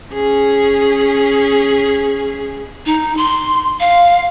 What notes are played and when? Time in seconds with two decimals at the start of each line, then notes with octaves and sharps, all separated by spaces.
0.14 C#4 G#4
2.86 D#4
3.17 C6
3.80 F5